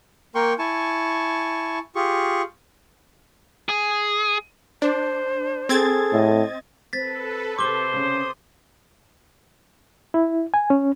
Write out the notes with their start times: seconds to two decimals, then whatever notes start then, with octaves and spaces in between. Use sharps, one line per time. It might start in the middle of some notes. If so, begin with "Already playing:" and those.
0.35 A#3 A#4 G5 C6 C#6
0.59 E4 G#5 A5 C#6
1.95 F4 G4 G#4 C#6
3.69 G#4
4.82 D4 C5
5.69 C4 G#4 A4 G#6 A6
6.13 A2 D#5
6.93 C4 A4 B4 A6 B6
7.59 C3 G4 A4 C5 D6 G7
7.94 C#3 C#4 D#6
10.14 E4
10.54 G#5
10.70 C#4